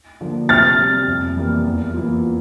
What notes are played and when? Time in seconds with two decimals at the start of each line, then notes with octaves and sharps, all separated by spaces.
0.21 D3 F3 A#3
0.49 C3 F6 A6
0.78 G3 C4
1.08 F2
1.37 E3 G3 A#3
1.65 E2
1.94 E3 A#3 F4